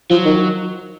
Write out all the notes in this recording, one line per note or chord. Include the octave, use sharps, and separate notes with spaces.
F3 F#3
D#3